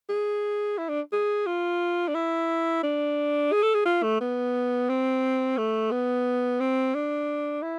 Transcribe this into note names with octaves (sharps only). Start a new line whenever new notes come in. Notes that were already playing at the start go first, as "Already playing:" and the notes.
G#4
E4
D4
G#4
F4
D4
E4
D4
G#4
A4
G#4
F4
A3
B3
C4
A3
B3
C4
D4
E4